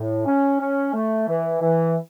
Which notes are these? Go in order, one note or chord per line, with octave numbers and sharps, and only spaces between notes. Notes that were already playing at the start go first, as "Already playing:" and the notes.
Already playing: A2
C#4
C#4
A3
E3
E3